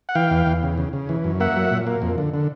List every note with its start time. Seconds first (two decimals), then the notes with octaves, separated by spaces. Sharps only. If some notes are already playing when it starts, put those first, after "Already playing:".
0.09 F#5
0.15 E3 F5 G5
0.31 E2
0.46 E2
0.63 C#3
0.78 C#3
0.93 C#3
1.09 E3
1.24 F#2
1.40 A#3 E5 F#5
1.56 F#3
1.71 A#2
1.87 A#3
2.02 F2
2.18 D3
2.34 D3